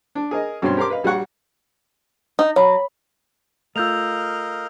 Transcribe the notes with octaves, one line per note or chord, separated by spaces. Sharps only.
D4
G#4 A#4 D#5
G2 B2 F#3 C4 C#4 C6
G4 A#4 A#5 C6 D6
B4 D#5 F5
A#1 G3 F#4 C#5 F#5 C#6
D#4
F#3 C#5 B5
A3 F4 A#4 D#5 F5 E6 G6 F7